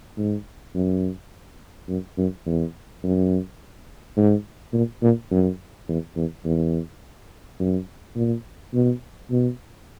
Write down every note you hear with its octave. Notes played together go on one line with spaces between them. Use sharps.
G#2
F#2
F#2
F#2
E2
F#2
G#2
A#2
A#2
F#2
E2
E2
E2
F#2
A#2
B2
B2